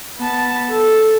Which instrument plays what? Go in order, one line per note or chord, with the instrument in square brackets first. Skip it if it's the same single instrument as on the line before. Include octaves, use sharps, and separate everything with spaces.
[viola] B3 A5
A4